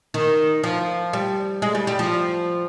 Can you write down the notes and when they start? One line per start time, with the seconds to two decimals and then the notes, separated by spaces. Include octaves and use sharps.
0.14 D#3
0.63 F3
1.13 G3
1.62 G#3
1.75 G3
1.87 G3
1.99 F3